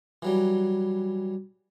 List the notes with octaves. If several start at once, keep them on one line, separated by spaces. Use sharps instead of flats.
E3 F#3 G3